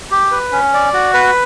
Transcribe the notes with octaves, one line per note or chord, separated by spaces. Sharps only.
G4
B4
C#4
D5
F#4
B4